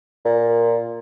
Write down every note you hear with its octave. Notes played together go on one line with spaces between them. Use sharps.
A#2